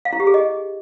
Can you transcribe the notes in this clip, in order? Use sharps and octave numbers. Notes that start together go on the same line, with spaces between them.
F5
E4
G4
G#4
D#5